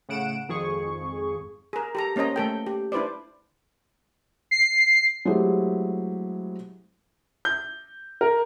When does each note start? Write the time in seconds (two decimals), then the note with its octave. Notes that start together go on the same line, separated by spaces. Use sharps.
0.09 A2 C#3 F#5 D7 E7
0.49 G#1 F2 G#4 C#6
1.73 G#4 A#4
1.95 G4 A4 A#5
2.16 A#3 C#4 C5 D#5 A#5
2.36 A3 A4 G5
2.67 G4
2.92 D4 E4 B4 C5 D5
4.51 C7
5.25 F#3 G#3 A3 C4 E4 G4
7.45 G6
8.21 A#4